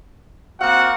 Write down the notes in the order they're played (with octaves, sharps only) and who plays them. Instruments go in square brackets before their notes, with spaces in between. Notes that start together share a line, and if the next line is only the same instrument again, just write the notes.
[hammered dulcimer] A#3 F5 [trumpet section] C4 F#4 F#5